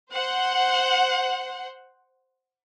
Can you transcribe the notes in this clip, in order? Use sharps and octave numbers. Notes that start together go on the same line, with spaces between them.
C5 F#5